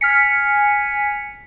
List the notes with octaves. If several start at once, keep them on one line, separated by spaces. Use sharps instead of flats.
G#5 F6 B6 C#7